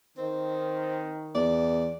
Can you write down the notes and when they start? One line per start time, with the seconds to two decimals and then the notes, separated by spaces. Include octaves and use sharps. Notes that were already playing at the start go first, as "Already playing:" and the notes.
0.17 D#3 C4
1.35 E2 D5